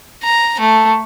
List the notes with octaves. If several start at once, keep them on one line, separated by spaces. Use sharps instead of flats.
A#5
A3